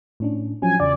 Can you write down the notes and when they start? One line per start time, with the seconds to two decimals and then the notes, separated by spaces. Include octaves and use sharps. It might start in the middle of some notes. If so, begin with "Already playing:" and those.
0.20 A2 C#4 D4
0.62 F3 F#3 C#4 G#5
0.80 E2 C#3 D5